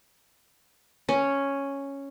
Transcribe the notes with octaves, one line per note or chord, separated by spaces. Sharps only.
C#4